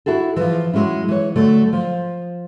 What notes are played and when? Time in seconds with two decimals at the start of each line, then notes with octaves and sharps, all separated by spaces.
0.06 E4 F#4 G#4 A4
0.36 E3 F3
0.74 F#3 G#3 C#4 E4
1.08 E3 C#5
1.36 D3 F#3 A3
1.73 F3